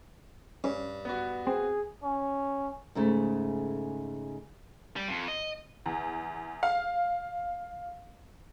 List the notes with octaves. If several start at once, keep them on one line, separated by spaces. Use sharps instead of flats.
G2 C#4
B3 F#4
C4 G#4
C#4
G#2 C#3 A3
G3
F2
D#5
E2
F5